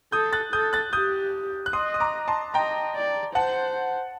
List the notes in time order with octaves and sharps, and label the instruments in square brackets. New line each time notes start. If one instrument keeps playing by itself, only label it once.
[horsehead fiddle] A4 [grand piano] D#6 G6
[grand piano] F#6 A6
[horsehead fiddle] A4 [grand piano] D#6 G6
[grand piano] F#6 A6
[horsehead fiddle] G4 [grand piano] D#6 G6
[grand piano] F#6
[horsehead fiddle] D#5 [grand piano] C6 D#6
[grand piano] D#6
A#5 D6
A5 C6
[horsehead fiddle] D#5 [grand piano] G5 A#5
[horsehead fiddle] D5
[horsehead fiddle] C5 [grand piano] F#5 A5